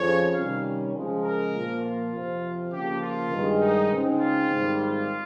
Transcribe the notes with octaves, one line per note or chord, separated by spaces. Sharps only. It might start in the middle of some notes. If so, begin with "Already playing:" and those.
Already playing: F2 C#3 F3 C#5
C3 D#3 G3 C#4 F5
C#3 F3 G#3
A#4
A#2 F3 A#3
F4
F2 C3 F3 C4
C#3 F3 A#3 G4
F4
G2 D#3 G#3
D#4
C#3 G#3 C4 D#4
F4
G#2 D#3 G3 C4
F4